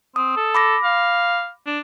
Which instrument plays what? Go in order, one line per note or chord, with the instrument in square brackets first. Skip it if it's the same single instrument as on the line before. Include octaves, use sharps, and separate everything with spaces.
[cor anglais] C4 [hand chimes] D#6
[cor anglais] A4
[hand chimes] B5 D6 A#6
[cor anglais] F5
D4